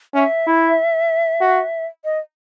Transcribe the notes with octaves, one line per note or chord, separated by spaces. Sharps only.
C#4 E5
E4
F#4
D#5